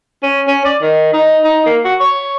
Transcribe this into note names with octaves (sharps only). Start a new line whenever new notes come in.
C#4
C#4
D5
D#3
D#4
D#4
A#3
F#4
C#5